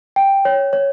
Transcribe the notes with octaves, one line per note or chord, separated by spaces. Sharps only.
G5
C#5
C#5